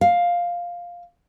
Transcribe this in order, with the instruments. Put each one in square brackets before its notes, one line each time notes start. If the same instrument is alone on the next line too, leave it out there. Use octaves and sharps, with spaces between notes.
[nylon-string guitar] F5